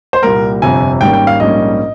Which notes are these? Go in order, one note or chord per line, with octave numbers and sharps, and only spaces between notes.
C5
C2 A#2 G3 A#3 A#4
G1 F2 C3 F3 G#5
G#1 G#2 G3 A#3 C#4 G5
G5
F5
A#1 G#2 G3 A#3 C#4 D#5